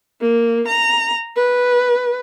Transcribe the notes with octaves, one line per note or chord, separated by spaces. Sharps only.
A#3
A#5
B4